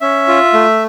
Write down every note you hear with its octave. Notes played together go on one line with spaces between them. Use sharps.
C#4 E5
F4
A3